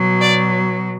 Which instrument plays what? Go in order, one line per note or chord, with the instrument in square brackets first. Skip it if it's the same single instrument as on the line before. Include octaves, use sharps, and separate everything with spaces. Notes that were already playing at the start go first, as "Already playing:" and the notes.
Already playing: [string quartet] B2 F#3
D5